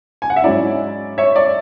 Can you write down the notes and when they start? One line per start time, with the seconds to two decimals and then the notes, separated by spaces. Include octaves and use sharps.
0.22 G#5
0.30 F#5
0.36 E5
0.44 G#2 F#3 C#4 E4 D5
1.18 C#5 E5
1.36 D5